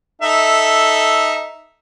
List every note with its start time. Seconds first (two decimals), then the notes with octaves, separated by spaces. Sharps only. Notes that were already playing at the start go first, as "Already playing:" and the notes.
0.22 D#4 A4 E5